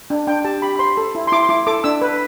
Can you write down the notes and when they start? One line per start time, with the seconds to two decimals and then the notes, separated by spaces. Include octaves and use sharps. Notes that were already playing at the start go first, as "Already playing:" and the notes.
0.10 D4
0.27 D4 G5
0.44 G4 A5
0.62 G4 B5
0.76 B5
0.79 C5 C6
0.97 A4
1.15 E4
1.27 C6
1.32 E4 D6
1.43 C6
1.49 E4 D6
1.67 A4 D6
1.84 D4 E6
2.02 B4